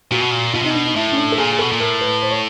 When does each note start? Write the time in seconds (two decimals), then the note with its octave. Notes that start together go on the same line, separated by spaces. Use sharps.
0.11 A#2 F#4
0.21 B2
0.31 A#2
0.53 B2 F4
0.62 C3 D#4
0.70 B2 D4
0.85 D#4
0.95 A2 E4
1.12 C#4
1.17 D4
1.32 A4
1.38 A#2 G#4
1.53 G#4
1.59 B2 A4
1.71 A#2
1.80 A2 A#4
2.01 B4
2.22 C5
2.31 C#5